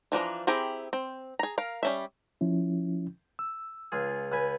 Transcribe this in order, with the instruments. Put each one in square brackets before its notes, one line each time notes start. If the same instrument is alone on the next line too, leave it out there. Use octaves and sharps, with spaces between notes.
[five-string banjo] E3 F3 D4 A#5
C4 E4 G4 G#4 A#5
C4
G#4 A#5
A#4 F5
G3 C#4 E5
[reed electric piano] F3 C#4 E4
E6
[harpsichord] C#2 F4 G#4
C#2 B4 G#5